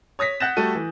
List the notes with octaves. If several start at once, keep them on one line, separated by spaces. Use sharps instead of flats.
C#5 D#6 A#6 B6
F#5 F#6 G6 A6 A#6 E7
G3 A3 F#4 A4 D#7
E3